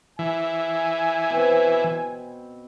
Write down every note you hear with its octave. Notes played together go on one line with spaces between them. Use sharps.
E3 G#5
B2 C4